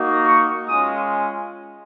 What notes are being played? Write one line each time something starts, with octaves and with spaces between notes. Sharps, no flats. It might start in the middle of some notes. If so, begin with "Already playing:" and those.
Already playing: A#3 D#4 F#4
C#6
G#3 C#4 F4 D#6